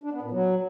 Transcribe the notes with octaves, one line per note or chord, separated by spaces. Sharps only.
D4
B3
A#2
F#3